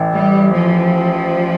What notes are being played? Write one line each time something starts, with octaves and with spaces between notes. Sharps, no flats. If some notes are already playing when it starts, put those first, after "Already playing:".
Already playing: A1 E3
G3
F3